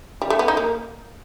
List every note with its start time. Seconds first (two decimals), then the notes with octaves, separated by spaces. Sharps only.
0.22 G3
0.30 A3
0.39 B3
0.48 D#4
0.57 A#3